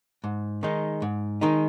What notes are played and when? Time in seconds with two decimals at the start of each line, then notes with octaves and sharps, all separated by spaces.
0.24 G#2
0.63 D#3 G#3 D#4
1.02 G#2
1.41 D#3 G#3 D#4